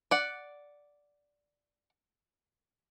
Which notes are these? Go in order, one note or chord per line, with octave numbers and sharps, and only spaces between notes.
D5 F#5